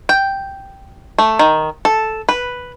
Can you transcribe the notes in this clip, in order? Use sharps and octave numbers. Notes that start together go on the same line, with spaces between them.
G5
A3
D#3
A4
B4